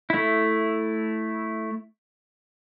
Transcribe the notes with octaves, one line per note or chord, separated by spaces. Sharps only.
A3 E4